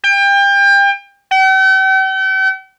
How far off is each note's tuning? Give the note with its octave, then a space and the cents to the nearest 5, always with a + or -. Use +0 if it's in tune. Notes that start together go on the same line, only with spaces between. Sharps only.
G5 +30
G5 -45